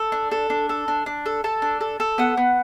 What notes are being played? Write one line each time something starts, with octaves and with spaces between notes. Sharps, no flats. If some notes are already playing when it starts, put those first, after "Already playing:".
Already playing: A4
D4
A4
D4
A4
D4
D4
A4
A4 A5
D4
A4
A4
B3 F#5
B3